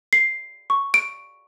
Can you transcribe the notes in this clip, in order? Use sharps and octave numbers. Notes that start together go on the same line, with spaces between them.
C7
C#6
D7